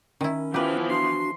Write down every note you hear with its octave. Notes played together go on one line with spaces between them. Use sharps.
D#3 C#4 E4
E3 F3 B3 G4 B4
D4 F#4 C6